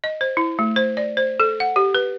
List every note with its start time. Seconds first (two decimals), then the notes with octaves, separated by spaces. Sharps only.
0.04 D#5
0.21 C5
0.37 E4
0.59 A3
0.76 C5
0.97 D5
1.17 C5
1.40 A4
1.60 F#5
1.76 G4
1.95 B4